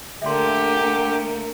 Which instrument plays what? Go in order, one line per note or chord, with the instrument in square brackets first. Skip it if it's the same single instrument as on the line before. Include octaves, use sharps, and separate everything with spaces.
[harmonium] D3 [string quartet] A3 A#3 [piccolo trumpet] G4 [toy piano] E5 C6
[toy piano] D4